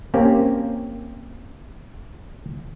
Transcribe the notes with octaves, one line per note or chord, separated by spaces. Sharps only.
A#3 C4 C#4 G4